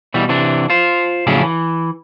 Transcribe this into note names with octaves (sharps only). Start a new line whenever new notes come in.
B2 E3 G3
C3 E3 D4
F4 C5
F2 A2 C#3 F#3 C#4 D4
E3